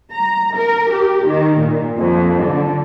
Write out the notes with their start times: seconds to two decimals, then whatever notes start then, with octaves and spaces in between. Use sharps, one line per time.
0.12 A#5
0.56 A#4
0.91 G4
1.27 D#3
1.60 A#2
1.97 F2
2.44 D3